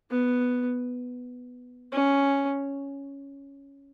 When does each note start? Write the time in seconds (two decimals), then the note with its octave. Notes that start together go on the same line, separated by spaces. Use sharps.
0.11 B3
1.92 C#4